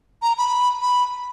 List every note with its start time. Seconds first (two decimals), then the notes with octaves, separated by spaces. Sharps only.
0.23 A#5
0.38 B5
0.82 B5